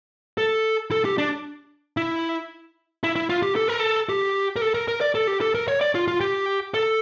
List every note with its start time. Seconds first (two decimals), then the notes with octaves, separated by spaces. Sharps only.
0.38 A4
0.91 A4
1.05 G4
1.18 D4
1.97 E4
3.04 E4
3.16 E4
3.30 F4
3.42 G4
3.56 A4
3.68 A#4
3.79 A4
4.09 G4
4.56 A#4
4.62 A4
4.74 A#4
4.88 A#4
5.01 D5
5.15 A4
5.27 G4
5.41 A4
5.55 A#4
5.68 C#5
5.81 D5
5.95 F4
6.08 F4
6.21 G4
6.74 A4